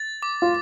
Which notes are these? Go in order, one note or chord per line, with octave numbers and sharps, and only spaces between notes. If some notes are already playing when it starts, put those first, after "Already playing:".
Already playing: A6
D6
F4